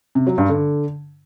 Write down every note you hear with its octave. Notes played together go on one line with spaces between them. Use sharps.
C3
F#3
G2
D3